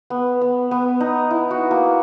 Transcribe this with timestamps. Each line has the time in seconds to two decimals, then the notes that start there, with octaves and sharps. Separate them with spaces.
0.10 B3
0.41 B3
0.71 B3
1.00 D#4
1.31 E4
1.51 F#4
1.71 A#3